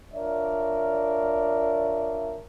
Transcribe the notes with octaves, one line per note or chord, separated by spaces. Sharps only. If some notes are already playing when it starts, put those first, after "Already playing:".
D4 F4 A#4 C#5 D5 E5